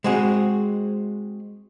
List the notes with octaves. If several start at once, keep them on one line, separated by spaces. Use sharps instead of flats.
G#3 C4 F#4 G#4